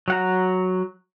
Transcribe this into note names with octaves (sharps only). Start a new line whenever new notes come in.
F#3 F#5 A#5